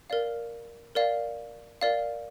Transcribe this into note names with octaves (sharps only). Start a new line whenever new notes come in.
A#4 D5 F5
A#4 D5 F5
A#4 D5 F5